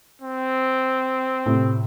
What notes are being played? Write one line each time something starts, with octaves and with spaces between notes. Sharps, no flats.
C4
A2 C3